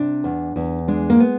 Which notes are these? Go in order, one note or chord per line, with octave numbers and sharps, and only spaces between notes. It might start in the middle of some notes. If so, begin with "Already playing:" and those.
Already playing: C3 D4
E2
E2
G#3 D4
A#3
B3